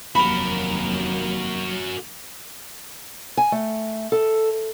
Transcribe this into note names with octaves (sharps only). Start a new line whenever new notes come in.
F1 D#2 F#3 A#3 F#4 A#4 B5
G#5
A3
A4